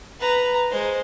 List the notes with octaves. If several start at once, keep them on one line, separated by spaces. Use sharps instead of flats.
B4 A#5
G#3 C5